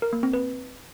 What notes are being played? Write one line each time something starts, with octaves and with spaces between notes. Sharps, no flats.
A#4
A#3
C4
B4